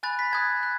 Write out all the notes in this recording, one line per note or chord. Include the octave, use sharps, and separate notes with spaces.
G#5 B5 F#6 A6
B6
A5 D#6 F#6 G#6
F#6